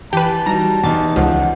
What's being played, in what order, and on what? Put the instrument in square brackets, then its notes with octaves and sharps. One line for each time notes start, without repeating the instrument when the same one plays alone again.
[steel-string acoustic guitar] E3 [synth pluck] G4 B4 [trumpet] A5
[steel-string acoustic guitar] F#3 G3 D#4 [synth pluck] A#5
[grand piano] E2 D#4 [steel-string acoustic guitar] G4 [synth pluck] A6
[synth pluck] C#2 F3 [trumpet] F#5